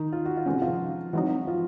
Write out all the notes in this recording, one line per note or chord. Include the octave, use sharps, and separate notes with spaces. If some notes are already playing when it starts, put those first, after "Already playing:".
Already playing: D#3 D#4
F4
F#4
F4
C3 E3 G#3 C#4 F#4
F3 F4
E3 F#3 G#3 C4 D#4 F#4
F3 F4